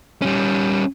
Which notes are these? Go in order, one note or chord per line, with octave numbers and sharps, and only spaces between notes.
G3 C#4